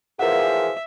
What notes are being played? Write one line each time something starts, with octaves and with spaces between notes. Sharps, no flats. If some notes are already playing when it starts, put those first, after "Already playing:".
F#2 E3 F3 G#4 A#4 E5 F#5